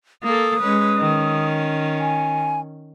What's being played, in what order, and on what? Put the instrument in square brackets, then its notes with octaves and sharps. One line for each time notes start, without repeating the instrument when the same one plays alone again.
[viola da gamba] A#3 A4 [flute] D#6
[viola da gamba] G#3 C#4 B4
D#3 C#4
[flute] G#5